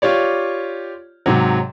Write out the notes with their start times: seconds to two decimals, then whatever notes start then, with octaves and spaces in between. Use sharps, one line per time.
0.02 F4 G4 C#5 D5
1.26 G#2 C3 F#3